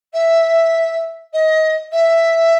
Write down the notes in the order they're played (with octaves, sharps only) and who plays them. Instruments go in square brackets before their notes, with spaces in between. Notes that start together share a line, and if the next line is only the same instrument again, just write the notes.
[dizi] E5
D#5
E5